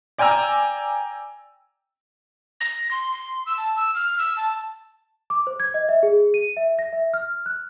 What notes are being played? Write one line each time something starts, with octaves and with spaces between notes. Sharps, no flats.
D5 G5 G#5 A#5 E6
A#6
C6
C6
E6
A5
E6
F6
E6
A5
D6
C5
G#6
D#5
E5
G#4
D#7
E5
A#6
E5
F6
F#6